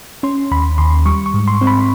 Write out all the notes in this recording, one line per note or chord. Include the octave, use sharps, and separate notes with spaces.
C#4 C6
D#2 B5
D#2 C6
G3 C#6
C#6
G#2
C6
C4
B5